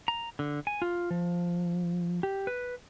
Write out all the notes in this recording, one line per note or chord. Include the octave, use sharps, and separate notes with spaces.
A#5
D3
G#5
F4
F3
G4
B4